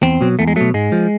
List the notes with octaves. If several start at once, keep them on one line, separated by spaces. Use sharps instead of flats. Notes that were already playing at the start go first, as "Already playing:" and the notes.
E2 C4
B2 F#3
E2 A3
G#3
B2 F#3 A3
G#2 G#3
F3